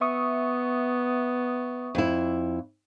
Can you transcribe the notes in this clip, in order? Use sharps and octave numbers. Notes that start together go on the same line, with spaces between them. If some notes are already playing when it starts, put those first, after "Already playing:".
B3 E5 C#6 D#6
F2 E4